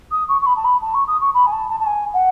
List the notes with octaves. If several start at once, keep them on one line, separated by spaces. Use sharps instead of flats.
D#6
C#6
C#6
B5
A5
B5
A5
C#6
D#6
C#6
B5
G#5
A5
A5
A5
G#5
F#5